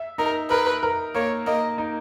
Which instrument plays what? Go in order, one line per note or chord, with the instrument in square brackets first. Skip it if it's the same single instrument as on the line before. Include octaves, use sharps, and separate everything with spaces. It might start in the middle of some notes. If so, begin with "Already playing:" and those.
Already playing: [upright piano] E5
[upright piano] D#4 [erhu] A#4
[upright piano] A#4 [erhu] B4
[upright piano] A#4
[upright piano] A#3 [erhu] C#5
[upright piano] A#3 [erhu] D#5
[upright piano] D#4